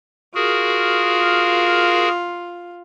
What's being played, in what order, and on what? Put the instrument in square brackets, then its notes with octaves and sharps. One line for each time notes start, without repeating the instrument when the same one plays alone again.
[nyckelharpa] F4 [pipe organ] F#4 G#4 A#4